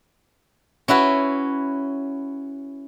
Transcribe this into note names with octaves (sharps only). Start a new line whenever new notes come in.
C#4 E4 F#4 B4